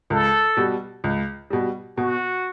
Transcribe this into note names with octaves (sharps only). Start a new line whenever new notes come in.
C#2 A4
B2 G3
C#2
B2 G3
B2 F#4